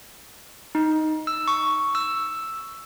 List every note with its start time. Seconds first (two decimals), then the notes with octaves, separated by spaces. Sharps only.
0.75 D#4
1.27 E6
1.48 C#6
1.95 E6